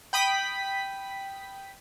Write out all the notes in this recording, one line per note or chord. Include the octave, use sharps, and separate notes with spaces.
G5 B5 D#6 B6